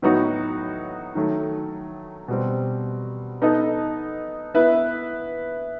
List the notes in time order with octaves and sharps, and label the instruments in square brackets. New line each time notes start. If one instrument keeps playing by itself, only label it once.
[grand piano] A2 F#3 B3 D#4 F#4
D#3 F#3 A3
B2 G3 C4
B3 D#4 A4 D#5
B3 E4 B4 E5